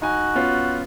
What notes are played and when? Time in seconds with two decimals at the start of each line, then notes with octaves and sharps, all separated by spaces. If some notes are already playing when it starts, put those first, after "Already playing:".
0.02 D#4 F#4 G#5
0.35 B3 C#4 F4